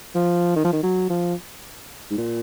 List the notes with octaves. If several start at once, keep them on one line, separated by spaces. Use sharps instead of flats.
F3
D#3
F3
D#3
F#3
F3
G#2
A#2